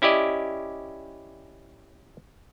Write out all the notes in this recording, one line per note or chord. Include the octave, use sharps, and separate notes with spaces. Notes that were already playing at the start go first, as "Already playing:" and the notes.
C#4 E4 G4 D5 D#5